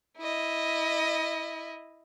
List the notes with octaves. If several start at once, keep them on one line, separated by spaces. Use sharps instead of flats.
E4 D#5